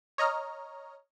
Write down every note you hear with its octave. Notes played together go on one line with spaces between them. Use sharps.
C#5 D#5 A#5 F6